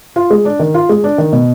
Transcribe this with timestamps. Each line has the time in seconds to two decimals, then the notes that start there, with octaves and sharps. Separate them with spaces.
0.16 F4
0.30 G#3
0.45 D4
0.59 D#3
0.74 F4
0.89 G#3
1.04 D4
1.18 D#3
1.33 B2